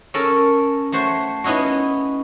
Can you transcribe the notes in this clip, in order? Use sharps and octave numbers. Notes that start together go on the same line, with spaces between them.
C#4 A4 A#4
A3 F#4 C5 C#5
B3 C#4 D#4 E4 F#4